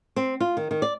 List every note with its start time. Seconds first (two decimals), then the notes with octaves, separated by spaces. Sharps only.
0.16 C4
0.40 F4
0.57 D#3
0.71 D#3
0.82 D5